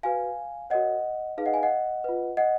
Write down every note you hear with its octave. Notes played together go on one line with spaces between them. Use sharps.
F#4 B4 F5 G#5
F#4 A#4 C#5 D#5 F#5
D#4 G#4 B4 F5
D#5 F#5
F5 G#5
D#5 F#5
F4 B4
D#5 F#5